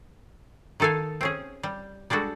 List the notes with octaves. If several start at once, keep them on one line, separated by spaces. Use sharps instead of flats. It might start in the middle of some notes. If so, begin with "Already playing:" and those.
D#3 D#4 A4 F5 G#5
C4 C#4 G#4
G3
G3 G#3 D4 F#4 A4